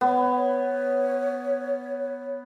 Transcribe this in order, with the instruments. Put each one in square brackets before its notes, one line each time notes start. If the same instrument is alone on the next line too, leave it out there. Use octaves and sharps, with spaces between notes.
[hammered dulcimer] B3 [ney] C#5